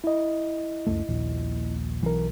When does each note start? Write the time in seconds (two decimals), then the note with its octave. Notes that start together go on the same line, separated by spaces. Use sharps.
0.04 E4 D#5
0.87 C#2 F#2 A3
1.09 A#1 D#2 A#2
2.03 B1 E3 A#4